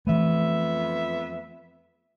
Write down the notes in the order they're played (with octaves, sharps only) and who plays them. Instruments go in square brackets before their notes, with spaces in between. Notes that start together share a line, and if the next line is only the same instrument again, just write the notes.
[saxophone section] F2 B3 E5 [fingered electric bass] E3 A3